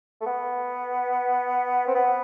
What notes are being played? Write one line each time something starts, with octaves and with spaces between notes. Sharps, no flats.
A3
B3
C4
B3